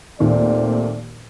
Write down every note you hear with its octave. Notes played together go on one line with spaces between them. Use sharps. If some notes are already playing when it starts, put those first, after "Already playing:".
D#2 A#2 D#3 A3 C4 D5